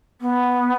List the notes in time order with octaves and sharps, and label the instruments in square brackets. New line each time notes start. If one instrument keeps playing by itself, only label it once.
[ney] B3